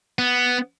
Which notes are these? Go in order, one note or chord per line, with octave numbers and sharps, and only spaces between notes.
B3